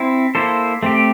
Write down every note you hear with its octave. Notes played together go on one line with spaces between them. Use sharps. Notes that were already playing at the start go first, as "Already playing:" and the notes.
Already playing: C4 E4
A#3 E4 A4 C5
A3 C4 G4